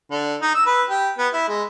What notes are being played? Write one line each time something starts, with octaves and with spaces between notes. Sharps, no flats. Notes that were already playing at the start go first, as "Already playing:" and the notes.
D3
D#4
E6
B4
G4
B3
E4
G#3